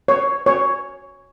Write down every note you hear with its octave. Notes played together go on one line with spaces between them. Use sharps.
C#5
C#5